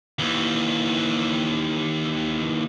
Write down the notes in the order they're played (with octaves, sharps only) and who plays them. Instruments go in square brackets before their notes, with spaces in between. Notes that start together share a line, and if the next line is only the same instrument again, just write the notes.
[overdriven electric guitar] D#2 E3